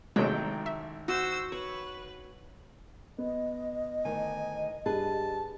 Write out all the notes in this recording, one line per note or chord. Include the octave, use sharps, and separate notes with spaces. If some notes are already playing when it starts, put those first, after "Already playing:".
A1 C3 D#3 F#3 G#3 A3 G5
E5
F#4 C5 E6
B4 C#5
B3 D#5
D2 D#3 G#5
G2 G3 G#4 B4 A5